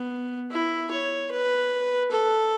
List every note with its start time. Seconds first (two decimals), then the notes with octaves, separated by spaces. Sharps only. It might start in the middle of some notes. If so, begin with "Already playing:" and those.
Already playing: B3
0.51 E4
0.91 C#5
1.31 B4
2.11 A4